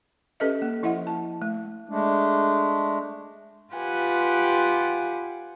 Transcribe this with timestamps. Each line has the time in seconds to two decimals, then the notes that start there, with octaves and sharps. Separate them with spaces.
0.40 C#4 G4 A4 B4 D#5 E5
0.62 A#3
0.83 F3 E4 D#5 E5 F#5
1.07 A5
1.42 A3
1.89 G#3 A3 D4
3.73 F4 G4 B4 F#5 G#5